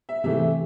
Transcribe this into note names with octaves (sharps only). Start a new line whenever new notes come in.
E5
C3 E3 A3 E5